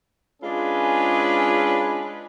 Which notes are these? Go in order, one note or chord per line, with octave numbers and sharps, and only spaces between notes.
G#3 C#4 D4 F4 G#4 B4